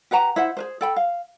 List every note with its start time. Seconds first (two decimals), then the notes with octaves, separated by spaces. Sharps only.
0.11 G4 B4 F#5 A#5
0.36 E4 C5 E5 F#5
0.57 G#4 B4 C5
0.81 A4 G5 B5
0.96 F5